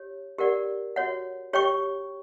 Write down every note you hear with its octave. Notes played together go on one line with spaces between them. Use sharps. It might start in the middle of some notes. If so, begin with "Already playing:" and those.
Already playing: G4 C#5
G4 A#4 D5 F#5
F#4 C#5 F#5
G4 C#5 G5 C#6